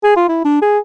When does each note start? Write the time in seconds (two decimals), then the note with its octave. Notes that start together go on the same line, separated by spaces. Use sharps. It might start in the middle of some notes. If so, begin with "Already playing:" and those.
0.04 G#4
0.17 F4
0.29 E4
0.45 D4
0.62 G#4